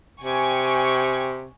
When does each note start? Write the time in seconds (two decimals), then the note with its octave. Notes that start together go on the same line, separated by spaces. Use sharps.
0.22 C3 G5 G#5 C#6